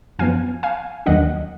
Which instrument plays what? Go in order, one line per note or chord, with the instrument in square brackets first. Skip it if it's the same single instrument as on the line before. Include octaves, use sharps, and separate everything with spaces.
[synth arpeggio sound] F#2 F3 B3 F5 G#5
F5 G#5
D#2 D#3 F#3 D4 D#5 F#5